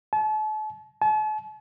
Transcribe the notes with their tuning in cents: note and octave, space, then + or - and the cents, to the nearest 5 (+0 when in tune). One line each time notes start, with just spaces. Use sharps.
A5 -40
A5 -45